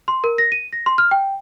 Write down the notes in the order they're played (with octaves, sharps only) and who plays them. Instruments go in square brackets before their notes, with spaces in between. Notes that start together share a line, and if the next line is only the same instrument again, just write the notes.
[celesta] C6
A#4
A#6
D#7
A#6
C6
F6
G5